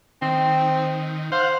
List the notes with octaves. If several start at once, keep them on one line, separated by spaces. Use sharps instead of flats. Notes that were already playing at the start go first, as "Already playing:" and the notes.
D#3 C4
C5 F5 F#5